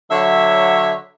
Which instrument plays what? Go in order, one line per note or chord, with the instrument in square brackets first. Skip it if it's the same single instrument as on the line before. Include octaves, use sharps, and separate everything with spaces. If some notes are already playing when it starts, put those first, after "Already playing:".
[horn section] D3 F#3 C#5 E5